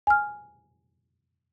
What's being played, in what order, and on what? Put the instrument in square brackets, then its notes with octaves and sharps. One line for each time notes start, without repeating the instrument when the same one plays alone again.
[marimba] G#5 F6